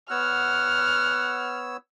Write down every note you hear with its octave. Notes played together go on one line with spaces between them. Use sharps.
B3 C#5 F#5 E6 F6